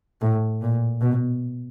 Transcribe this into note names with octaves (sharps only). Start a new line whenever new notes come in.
A2
A#2
B2